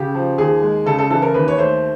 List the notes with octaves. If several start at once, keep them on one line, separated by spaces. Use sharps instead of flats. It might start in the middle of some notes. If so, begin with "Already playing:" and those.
Already playing: C#3 G4
F3
D#2 G#4
G#3
C#3 A4
A4
E3 A4
A#4
D#2 B4
C#5
A3 C5